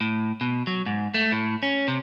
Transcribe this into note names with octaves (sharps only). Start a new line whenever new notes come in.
A2
B2
F#3
G#2
A3
A2
C#4
C3